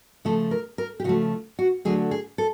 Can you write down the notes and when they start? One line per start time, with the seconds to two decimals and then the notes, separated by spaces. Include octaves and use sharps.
0.25 C#3 F3 A3 A4
0.51 A#4
0.78 A#4
1.00 G4
1.04 C#3 F3 A3 F#4
1.59 F#4
1.85 D3 F#3 A3 G#4
2.11 G#4
2.38 A4